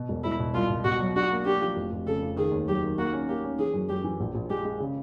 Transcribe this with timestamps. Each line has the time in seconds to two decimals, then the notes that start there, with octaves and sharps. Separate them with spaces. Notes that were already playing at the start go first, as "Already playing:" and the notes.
Already playing: B2
0.09 E1
0.24 E1 E4
0.39 B2
0.54 C2 F4
0.70 B2
0.84 B2 F#4
1.00 F#3
1.16 D4 F#4
1.31 A#3
1.45 D4 G4
1.61 F3
1.76 F1
1.92 F1
2.06 C#3 A4
2.22 F1
2.36 D#3 G#4
2.52 D#2
2.68 F#3 G4
2.83 D#3
2.98 A#3 F#4
3.13 C#4
3.28 A#3 G4
3.44 C#4
3.59 E3 G#4
3.73 F#2
3.89 F#2 G4
4.04 E3
4.20 A#1
4.35 A#1
4.50 G#3 G4
4.65 G#3
4.80 C#3